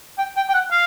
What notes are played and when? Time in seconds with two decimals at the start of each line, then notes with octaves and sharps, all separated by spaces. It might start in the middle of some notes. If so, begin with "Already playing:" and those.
0.18 G5
0.36 G5
0.49 G5
0.54 F#5
0.71 F5